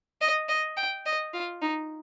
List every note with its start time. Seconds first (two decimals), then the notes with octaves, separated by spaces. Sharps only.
0.21 D#5
0.48 D#5
0.77 G5
1.06 D#5
1.33 F4
1.62 D#4